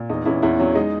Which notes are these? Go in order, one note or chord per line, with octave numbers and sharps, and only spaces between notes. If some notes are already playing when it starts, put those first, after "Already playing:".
Already playing: A#2
E2 D#4
E2 C#4 E4
E2 C#4 E4
F#3 C#4
G#3 D#4